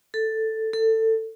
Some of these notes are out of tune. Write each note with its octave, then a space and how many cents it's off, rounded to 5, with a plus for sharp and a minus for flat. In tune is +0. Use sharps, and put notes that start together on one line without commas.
A4 +5
A4 +20